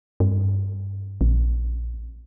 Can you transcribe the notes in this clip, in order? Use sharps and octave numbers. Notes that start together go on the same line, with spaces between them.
G2
A#1